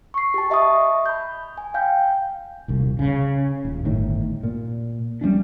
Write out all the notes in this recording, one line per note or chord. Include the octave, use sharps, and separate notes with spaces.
C#6 C7
G4 A5
D#5 E5 A5 C#6 D#6
B5 G6
G#5
F5 G5 G6
D#1 C2
C#3
D#1
G1 A2 D#3
A#2
G3 A3 C#4 D4